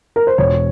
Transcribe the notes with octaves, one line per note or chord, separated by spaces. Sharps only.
A#4
C5
E1 C#5